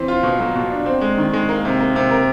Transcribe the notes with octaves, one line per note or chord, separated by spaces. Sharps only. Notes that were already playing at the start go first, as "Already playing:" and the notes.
Already playing: E3 C4
F4
B2
F#3
B2
D4
C4
G#3
D#3
G#3
A#3
C3
A#3
C3
A#4